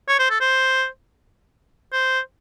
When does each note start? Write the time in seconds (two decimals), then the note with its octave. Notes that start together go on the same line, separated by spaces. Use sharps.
0.08 C#5
0.19 C5
0.30 A4
0.41 C5
1.92 C5